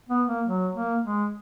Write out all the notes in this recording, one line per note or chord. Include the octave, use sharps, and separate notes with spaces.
B3
A#3
F#3
A#3
G#3